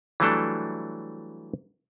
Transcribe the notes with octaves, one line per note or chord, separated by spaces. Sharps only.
E3 F#3 G3 A3 D4 A4